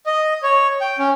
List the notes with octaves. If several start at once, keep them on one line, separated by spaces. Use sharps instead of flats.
D#5
C#5
G5
C#4